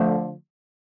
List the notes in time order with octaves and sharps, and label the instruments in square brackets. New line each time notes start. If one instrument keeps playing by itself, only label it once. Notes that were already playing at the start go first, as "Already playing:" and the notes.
Already playing: [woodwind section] D3 F3 A3